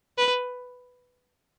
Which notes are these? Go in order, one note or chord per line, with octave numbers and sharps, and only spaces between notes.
B4